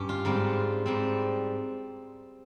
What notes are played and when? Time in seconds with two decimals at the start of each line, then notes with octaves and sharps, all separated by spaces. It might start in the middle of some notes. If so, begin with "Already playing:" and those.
Already playing: G2 C#4 G4
0.09 F4
0.25 G#2 G3 C4
0.86 G#2 G3 C4